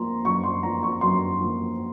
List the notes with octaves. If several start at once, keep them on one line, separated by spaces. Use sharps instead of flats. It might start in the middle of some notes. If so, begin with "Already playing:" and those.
Already playing: F3 A#3 A#5 C6
F#2 C#6
C6
F3 A#3 A#5
C#6
F#2 C6
F3 A#3